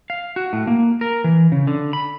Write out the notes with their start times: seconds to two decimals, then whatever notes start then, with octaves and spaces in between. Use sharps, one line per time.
0.10 F5
0.36 F#4
0.53 A2
0.67 A#3
1.01 A#4
1.24 E3
1.52 C#3
1.67 D3
1.93 B5